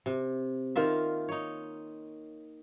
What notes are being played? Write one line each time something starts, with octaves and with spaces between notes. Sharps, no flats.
C3
D#3 A#3 F4 E5
D#4 C#5